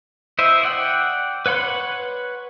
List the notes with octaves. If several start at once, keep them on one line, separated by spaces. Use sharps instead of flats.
E4 C5 D#5 E5
D5 F#5 G5
B4 C#5 F#5 B5 C6